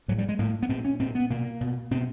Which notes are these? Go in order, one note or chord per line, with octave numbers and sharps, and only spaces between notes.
A2 F#3
G3
G#3
A2 A#3
B3
A#2 C4
C#4
A#2 C4
B3
B2 A#3
B2
B2 C4